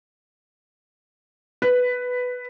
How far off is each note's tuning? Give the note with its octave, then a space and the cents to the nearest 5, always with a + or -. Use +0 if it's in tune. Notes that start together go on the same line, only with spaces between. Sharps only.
B4 +5